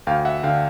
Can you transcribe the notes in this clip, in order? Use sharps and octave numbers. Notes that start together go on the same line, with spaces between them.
D2 F5 G5
E5 F#5
D3 F5 G5